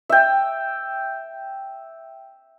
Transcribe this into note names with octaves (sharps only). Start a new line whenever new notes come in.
E5 G5